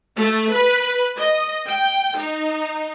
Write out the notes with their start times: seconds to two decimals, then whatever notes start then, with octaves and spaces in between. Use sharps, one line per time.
0.17 A3
0.53 B4
1.18 D#5
1.67 G5
2.18 D#4